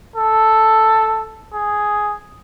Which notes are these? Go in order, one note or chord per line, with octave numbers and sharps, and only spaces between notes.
A4
G#4